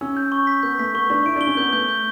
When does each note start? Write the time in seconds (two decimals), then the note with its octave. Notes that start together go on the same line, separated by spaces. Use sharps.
0.01 C#4 E6
0.17 G6
0.32 C#6
0.47 B6
0.63 B3 G6
0.79 A3 B6
0.94 B3 C#6
1.10 D4 C#6
1.26 E4 D7
1.36 D4
1.41 G7
1.47 C#4
1.57 B3 G6
1.72 A3 G6
1.89 G6